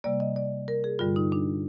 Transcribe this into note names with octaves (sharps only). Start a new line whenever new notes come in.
C3 G3 A#3 D5
D#5
D5
A#4
G#4
G2 D3 G3 F4
D#4
D4